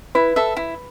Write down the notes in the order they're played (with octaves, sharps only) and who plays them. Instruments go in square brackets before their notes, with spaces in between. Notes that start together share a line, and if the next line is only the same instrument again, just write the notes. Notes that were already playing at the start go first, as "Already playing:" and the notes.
[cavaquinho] E4 [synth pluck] B4
[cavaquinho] A4 E5
E4